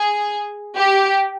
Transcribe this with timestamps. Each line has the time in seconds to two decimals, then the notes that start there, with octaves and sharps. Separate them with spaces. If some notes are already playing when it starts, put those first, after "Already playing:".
Already playing: G#4
0.77 G4